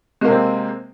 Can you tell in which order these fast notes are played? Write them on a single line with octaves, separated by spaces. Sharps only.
G#3 A#3 C3 C4